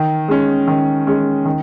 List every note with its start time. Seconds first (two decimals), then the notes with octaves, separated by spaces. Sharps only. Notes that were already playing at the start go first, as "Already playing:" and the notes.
Already playing: D#3
0.28 G#3 C#4
0.68 D#3
1.07 G#3 C#4
1.45 D#3